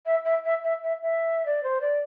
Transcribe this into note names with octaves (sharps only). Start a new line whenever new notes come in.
E5
E5
E5
E5
E5
E5
D5
C5
D5